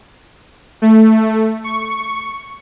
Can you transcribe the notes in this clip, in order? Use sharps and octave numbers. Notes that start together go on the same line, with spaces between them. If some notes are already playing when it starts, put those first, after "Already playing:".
A3
C#6